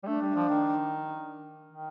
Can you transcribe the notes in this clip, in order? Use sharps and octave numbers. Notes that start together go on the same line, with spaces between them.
G3
A3 D4
G3
F3
D#3
D#3